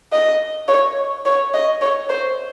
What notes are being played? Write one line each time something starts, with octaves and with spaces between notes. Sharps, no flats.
D#5
C#5
C#5
D#5
C#5
C5